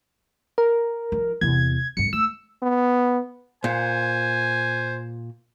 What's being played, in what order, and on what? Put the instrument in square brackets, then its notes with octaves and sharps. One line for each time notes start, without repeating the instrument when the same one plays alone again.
[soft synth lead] A#4
[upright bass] F3 D#4
[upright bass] E2 C3 [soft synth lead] G#6
[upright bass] G#1 G2 [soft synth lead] C#7
[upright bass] A3 [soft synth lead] E6
[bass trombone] B3
[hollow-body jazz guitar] A#2 [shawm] C5 [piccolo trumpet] G#5